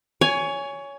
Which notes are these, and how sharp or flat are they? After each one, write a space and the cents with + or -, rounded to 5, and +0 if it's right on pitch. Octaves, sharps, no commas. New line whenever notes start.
C#5 +20 G#5 +0